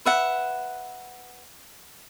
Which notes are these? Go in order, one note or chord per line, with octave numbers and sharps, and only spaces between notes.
B4 E5 F#5